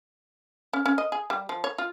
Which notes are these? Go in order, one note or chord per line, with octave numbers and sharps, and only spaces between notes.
C#4
C#4
D#5
G#4
G3
F3
C#5
F4